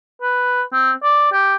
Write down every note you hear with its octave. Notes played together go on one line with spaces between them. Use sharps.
B4
C4
D5
G4